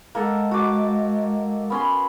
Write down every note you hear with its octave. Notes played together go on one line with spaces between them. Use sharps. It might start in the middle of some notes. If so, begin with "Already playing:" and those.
G#3 A#3 A4 F#5
F#4 D6
B3 C#4 C6